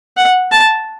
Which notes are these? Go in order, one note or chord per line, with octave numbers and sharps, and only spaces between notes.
F#5
A5